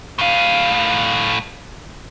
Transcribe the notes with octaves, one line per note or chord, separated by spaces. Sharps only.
A2 F5